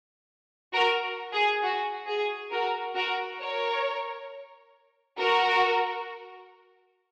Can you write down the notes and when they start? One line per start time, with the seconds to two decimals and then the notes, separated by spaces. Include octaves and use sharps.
0.73 F#4 A#4
1.33 G#4
1.63 F#4
2.07 G#4
2.51 F#4 A#4
2.96 F#4 A#4
3.41 A#4 C#5
5.18 F#4 A#4